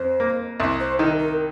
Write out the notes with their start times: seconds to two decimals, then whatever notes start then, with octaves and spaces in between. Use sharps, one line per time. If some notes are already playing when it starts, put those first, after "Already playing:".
Already playing: F2 C5
0.20 A#3
0.60 C2
0.80 C5
0.99 D#3 A#4
1.18 A#4